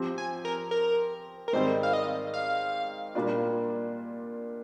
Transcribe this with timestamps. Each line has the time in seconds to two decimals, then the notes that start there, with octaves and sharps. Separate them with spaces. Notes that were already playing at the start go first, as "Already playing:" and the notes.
Already playing: F3 C4 G4
0.18 G#5
0.45 A#4
0.71 A#4
1.48 A#4
1.53 G#2 D#3 G3 C4 C5
1.83 F5
1.93 D#5
2.34 F5
3.15 A#2 G3 A#3 D4 F4